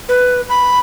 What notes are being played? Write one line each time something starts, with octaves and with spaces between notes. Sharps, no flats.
B4
B5